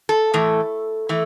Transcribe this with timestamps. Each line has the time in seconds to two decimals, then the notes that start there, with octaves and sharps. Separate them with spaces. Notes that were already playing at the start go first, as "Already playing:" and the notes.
0.09 A4
0.34 A2 E3 A3
1.09 E3 A3